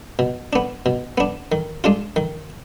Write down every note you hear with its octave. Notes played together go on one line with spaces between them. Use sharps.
B2
B3 D4
B2
B3 D4
D#3
G#3 D4 F4
D#3